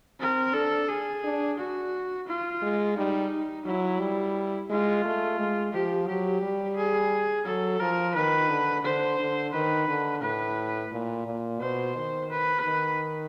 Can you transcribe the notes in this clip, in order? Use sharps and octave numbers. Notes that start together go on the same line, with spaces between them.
C4 A#4
D4 A4
G#4
D4
F#4
F4
G#3
G3 D#4
F#3 E4
G3
G#3 F4
A3
G#3
F3 G4
F#3 G4
G3
G#4
F#3 A4
F3 A#4
D#3 B4
D3
D3 C5
D3
D#3 B4
D3
A2 B4
A#2
A#2
B2 C5
D#3
B4
D#3